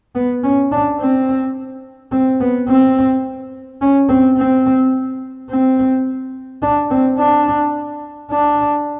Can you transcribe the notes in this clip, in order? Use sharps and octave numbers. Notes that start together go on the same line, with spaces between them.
B3
C#4
D4
C4
C4
B3
C4
C#4
C4
C4
C4
D4
C4
D4
D4